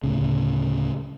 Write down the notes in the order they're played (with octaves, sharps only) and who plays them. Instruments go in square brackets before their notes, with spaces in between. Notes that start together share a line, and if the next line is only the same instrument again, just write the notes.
[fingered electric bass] D2 A2 C#3